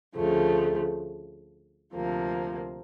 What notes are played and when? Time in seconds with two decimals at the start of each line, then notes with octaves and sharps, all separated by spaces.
0.14 D2 C#3 F3 A3
1.93 D2 C3 F3 A#3